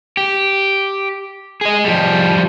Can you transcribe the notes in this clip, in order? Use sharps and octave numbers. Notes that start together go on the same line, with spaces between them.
G4
G#4 D#5
F3 G3